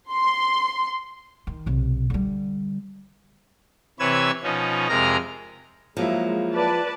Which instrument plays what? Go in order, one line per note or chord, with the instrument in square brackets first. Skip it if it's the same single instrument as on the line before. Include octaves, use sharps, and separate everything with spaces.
[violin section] C6
[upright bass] D#3
B1 C3
D3 G3
[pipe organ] C3 E3 B4 C#5 E6 G#6
B2 F3 C#4 D#4
F2 C3 G#3 A#4 A#5 F6
[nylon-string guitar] F3 [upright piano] F#3 A#3 E4 [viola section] G#3
[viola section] B4 D5 A5